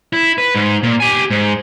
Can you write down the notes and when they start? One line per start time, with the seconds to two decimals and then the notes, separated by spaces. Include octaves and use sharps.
0.13 E4
0.38 B4
0.55 G#2
0.83 A#2
1.00 G4 G#5
1.30 G#2